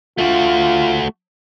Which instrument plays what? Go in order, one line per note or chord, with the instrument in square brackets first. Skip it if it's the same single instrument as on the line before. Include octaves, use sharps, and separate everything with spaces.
[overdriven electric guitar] A3 F#4 [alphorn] F4